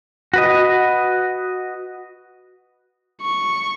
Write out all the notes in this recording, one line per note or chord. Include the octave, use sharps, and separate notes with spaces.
F#4 B4 D#5
C#6